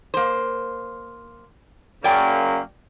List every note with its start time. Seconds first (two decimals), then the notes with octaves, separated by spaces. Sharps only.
0.14 A#3 C5
2.04 F#2 C#3 A#3 D5 G5